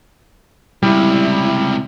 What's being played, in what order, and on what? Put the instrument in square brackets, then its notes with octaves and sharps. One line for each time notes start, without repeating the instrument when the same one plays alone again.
[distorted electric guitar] C#2 C3 [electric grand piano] G3 [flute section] E4